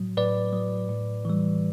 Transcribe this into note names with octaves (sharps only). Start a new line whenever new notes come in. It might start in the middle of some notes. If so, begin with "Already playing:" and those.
Already playing: A2 F#3
A2 B4 D5
F#3
A2
E3 G3